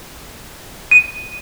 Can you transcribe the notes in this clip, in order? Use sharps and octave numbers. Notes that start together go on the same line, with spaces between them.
D#7